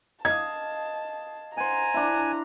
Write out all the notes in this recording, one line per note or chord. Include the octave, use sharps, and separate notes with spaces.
D#5 F5 A5 G#6
C5 F#5 G#5 A#5
D4 E4